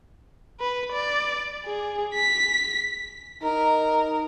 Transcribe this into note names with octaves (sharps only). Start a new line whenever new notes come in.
B4
D5
G#4
B6
D#4 A#4